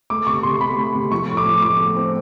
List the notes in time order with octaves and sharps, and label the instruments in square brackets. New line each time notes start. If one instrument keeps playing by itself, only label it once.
[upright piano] A3 [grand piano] D6
[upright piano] C3 [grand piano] C#6
[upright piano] C3 [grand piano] C6
[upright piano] A3 [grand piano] B5
[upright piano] A3
C3
[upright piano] F3 [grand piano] C#6
[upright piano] A2
[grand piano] D6
[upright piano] F3
[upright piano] F3 [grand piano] D6
[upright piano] A3
C4